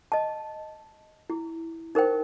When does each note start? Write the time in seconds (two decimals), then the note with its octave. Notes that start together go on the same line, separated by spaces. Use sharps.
0.12 D#5 A5
1.30 E4
1.95 D#4 A#4 C5 G5